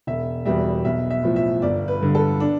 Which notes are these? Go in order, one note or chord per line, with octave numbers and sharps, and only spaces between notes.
E1 E5
E2 B2 G3 E5
B1 E5
E5
A2 F3
E5
G1 D5
B4
G2 D3
A4
D4